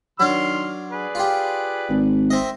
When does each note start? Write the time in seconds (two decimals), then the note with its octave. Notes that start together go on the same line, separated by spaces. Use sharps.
0.20 D#3 F#3 D4 C6 F6
0.92 G#4 B4 D5
1.15 F4 G4
1.90 G#1
2.30 C4 D#5 E5